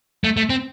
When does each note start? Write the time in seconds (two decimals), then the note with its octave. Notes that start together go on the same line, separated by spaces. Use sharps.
0.24 A3
0.37 A3
0.50 C4